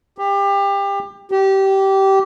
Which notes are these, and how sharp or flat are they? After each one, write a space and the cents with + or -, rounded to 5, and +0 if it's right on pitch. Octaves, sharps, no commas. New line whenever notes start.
G4 +25
G4 -20